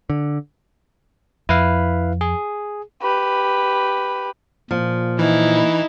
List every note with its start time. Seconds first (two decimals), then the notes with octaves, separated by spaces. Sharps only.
0.10 D3
1.49 F2 E4 B4 F5
2.21 G#4
3.02 G4 B4
4.71 A#2 F3
5.19 E3 D#4 E4